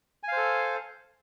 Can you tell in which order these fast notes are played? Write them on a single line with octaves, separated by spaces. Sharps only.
G#5 F5 C5 A4